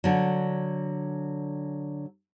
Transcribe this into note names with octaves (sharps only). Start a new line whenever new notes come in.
D3 F#3